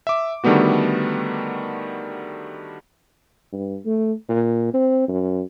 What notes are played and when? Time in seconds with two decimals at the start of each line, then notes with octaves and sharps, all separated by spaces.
0.07 E5 D6
0.44 D3 D#3 G3 A3 B3 F#4
3.53 G2
3.86 A3
4.29 A#2
4.74 C4
5.08 F#2